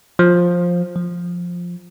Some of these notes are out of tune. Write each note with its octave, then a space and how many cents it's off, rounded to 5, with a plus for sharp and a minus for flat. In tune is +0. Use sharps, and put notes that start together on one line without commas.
F3 +10
F3 +5